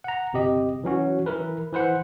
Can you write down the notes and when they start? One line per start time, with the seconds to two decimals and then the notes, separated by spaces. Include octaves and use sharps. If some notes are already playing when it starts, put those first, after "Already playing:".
0.04 F#5 A#5
0.33 G1 C3 G4 D#5
0.84 E3 F#3 C#4 F#4
1.26 E3 E4 A#4 B4
1.73 E3 B4 C5 F#5